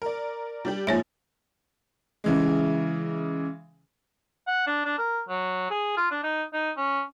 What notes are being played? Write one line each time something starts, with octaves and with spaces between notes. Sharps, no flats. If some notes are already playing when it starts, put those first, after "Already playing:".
A#4 D5
G3 D4 G4
G#2 F3 A#3 C#5 E5
C#3 E3 G#3
F#5
D4
D4
A#4
F#3
G#4
F4
D4
D#4
D#4
C#4